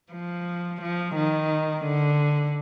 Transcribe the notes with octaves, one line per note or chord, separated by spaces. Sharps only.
F3
F3
D#3
D3